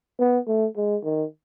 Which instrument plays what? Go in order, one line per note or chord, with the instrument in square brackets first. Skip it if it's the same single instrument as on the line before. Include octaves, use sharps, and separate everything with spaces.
[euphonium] B3
A3
G#3
D#3